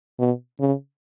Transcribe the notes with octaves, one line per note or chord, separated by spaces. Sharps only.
B2
C#3